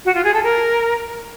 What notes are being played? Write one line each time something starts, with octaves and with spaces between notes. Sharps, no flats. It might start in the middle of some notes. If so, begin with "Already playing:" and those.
F#4
F4
G#4
A4
A#4